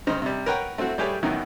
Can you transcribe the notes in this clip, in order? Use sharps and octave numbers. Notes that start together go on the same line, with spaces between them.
G2 C#3 C5 D#5 A#5
C3 G3
A#4 B4 C#5 F#5 G5 A#5
A3 C4 E4 F#4
G3 A3 G4 G#4 B4 C#5
F#2 B2 D#3 E3 B3 C#4